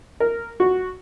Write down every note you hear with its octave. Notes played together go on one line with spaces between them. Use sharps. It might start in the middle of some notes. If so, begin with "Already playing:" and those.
A#4
F#4